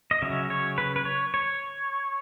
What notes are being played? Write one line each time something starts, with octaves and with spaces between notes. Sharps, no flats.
D#5
C#3 F#3 C#4 E5
C#5
B4
B4
C#5
C#5